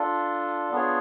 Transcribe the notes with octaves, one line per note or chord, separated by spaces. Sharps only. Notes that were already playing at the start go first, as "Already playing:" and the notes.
Already playing: D4 F4 A4
B3 D4 F4 G#4 C#5